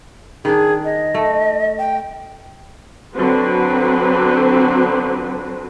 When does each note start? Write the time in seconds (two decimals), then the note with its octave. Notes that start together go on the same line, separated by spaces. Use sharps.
0.45 D#3 D4 G#4
0.85 D#5
1.14 A3
1.78 G5
3.14 D3 F#3 C4 F#4 B4 C5